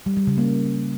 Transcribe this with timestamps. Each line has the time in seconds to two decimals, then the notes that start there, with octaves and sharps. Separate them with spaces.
0.06 G3
0.17 G3
0.27 C#3
0.38 A#3